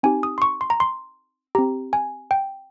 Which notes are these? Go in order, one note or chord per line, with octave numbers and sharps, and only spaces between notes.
C4 D#4 G4 G#5
D#6
C6
C#6
C6
A#5
C6
C4 G4 A#5
G#5
G5